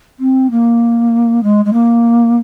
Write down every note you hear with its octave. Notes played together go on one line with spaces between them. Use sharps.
C4
A#3
G#3
G#3
A#3